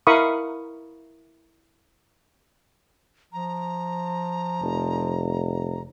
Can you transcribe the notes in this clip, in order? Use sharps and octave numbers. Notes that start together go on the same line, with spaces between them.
E4 A#4 F5 B5 C#6 D#6
F3 A#5
F1